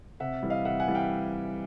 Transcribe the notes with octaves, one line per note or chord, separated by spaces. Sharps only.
C3 E5 F#5
E3 G3
D#5 F5
C3 E5 F#5
F#5 G#5
E3 G3
F5 G5